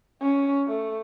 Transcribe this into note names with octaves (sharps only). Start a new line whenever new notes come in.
C#4
A3